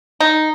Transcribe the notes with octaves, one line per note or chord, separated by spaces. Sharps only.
D#4